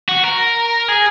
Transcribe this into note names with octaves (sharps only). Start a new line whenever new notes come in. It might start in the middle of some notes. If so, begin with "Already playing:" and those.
F#4
A#4
G#4